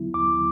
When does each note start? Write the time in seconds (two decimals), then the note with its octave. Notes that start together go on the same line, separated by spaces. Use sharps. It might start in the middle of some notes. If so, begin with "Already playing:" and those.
Already playing: D#2 D3 F#3 B3 E4
0.14 D#2 D6